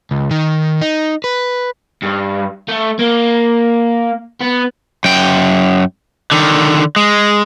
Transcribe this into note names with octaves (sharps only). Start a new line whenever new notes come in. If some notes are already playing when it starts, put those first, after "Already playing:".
C#2
D#3
D#4
B4
G2
A3
A#3
B3
F#2 G5
D3 D#3
G#3